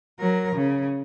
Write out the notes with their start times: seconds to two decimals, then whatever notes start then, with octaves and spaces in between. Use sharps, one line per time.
0.19 F#3 A#4
0.56 C#3